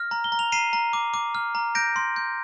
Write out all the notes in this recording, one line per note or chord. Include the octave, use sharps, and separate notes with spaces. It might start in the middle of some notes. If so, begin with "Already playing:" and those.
Already playing: F6 A#6
A#5
G7
A#5
F7
A#5 C7 D#7
A#5
D6
D6
F6
A#5
G6 A#6 D7
C6
G6